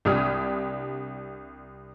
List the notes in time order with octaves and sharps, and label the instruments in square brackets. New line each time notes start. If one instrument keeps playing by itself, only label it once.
[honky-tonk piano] C2 D4 G4 D#6 F6 G#6